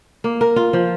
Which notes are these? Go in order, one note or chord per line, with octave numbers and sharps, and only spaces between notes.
A#3
A#4
F4
F3